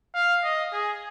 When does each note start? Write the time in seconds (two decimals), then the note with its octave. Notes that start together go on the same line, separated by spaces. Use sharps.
0.14 F5
0.44 D#5
0.73 G#4